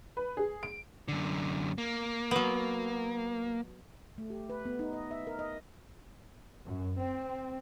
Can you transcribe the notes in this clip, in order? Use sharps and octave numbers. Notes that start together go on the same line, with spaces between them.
B4
G#4
D7
F#2 D3
A#3
F#3 B3
A3
G4
B4
B3
D#4
D#5
E5
A#4
D#5
F#2
C4